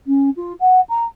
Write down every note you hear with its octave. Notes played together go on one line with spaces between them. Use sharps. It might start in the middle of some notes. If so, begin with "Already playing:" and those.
C#4
F4
F#5
A#5